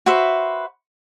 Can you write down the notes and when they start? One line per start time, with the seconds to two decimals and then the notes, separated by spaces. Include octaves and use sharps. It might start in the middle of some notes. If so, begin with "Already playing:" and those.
0.06 F#4 B4 C5 E5